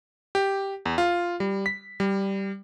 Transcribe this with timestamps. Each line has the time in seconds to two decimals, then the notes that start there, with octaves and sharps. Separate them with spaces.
0.35 G4
0.85 E2
0.98 F4
1.40 G3
1.66 B6
2.00 G3